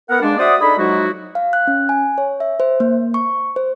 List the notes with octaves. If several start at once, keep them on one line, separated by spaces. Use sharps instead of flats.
B3 A#4 F#5
G#3 A#3 D4
F#4 C5 D5 E5 F#5 D#6
D4 D#4 G#4 A4 D#5 B5
F3 F#3 G#3 D#4 E4 F#4
F5
F#6
C#4
G#5
C#5
E5
C5
A#3
C#6
C5